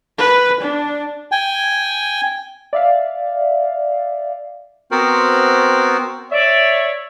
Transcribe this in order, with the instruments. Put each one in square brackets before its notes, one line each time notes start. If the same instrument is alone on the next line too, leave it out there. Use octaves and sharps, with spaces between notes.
[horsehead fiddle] B4
D4
[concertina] G5 G#5
[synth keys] D5 E5 F5
[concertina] B3 C4 F#4 A#4 C5
[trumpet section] C#5 E5 [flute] D5